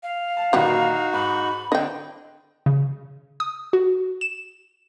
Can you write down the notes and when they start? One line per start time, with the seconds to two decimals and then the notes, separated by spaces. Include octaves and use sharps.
0.03 F5
0.37 A5
0.53 A#2 D#3 E3 F#3 G3 D#4 F#4 F#5
1.13 G#2 B5
1.72 D3 C4 D#5 G5
2.66 C#3
3.40 D#6
3.73 F#4
4.21 E7